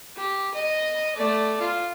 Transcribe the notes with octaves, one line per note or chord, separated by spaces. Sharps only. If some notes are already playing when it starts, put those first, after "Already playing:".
G4
D#5
A3 D5
F4